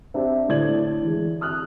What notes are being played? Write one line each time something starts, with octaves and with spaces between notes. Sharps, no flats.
C4 D4 G4 E5
A2 D3 D5 G#6 F#7
E3 G#3
D#6 F6 F#6